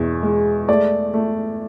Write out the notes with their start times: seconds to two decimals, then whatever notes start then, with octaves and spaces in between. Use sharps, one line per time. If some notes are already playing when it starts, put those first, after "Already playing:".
Already playing: E2 B2
0.23 G#3
0.68 A3 D5
1.14 A3